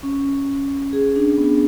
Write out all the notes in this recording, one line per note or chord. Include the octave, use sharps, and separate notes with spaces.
C#4
G#4
D4
B3